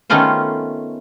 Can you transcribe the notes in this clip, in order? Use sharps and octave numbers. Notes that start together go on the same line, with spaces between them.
D#3 A3 B3 C#4 F4 C5